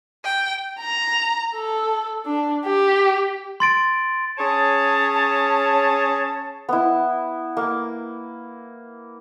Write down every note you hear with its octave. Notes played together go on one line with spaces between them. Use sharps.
G5
A#5
A4
D4
G4
C6 A6 D7
C#4 G#4 C#5 A5
B3 E4
A#3